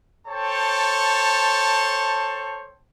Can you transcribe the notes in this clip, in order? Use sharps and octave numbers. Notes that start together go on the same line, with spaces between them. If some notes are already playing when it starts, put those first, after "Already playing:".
A4 C5 C#5 G5 A5